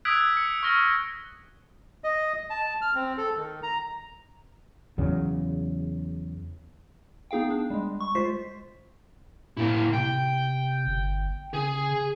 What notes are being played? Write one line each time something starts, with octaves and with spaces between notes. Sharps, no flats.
D#6 E6 F#6 G#6 B6 D7
C#7
C#6 F6 A#6 G7
D#5
A5
F6
C4
A4
D#3
A#5
E2 C#3 F#3
B3 D#4 G#4 F5 G5
D4
G3 G#3
C#6
G#3 F4 C5 B6 C7
A2 A#3 E4
C3 G5
G1
C#3 G#4